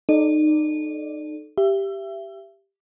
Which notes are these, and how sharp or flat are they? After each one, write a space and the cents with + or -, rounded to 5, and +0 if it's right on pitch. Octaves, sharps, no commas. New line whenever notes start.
D#4 -25 A4 -20 D5 +0
G4 +0 E5 +30